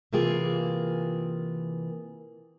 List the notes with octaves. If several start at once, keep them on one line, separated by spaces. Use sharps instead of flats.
C3 E3 A#3 F4 G#4